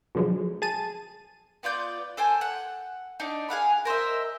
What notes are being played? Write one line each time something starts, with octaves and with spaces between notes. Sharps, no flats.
B2 D3 F3 F#3 G#3
G#4 A5 D#7
B3 F4 D5 G6
A4 C5 G5 G#5
F#5
D4 D#4
G#4 F5 F#5 B5
A#4 C5 D#5 E5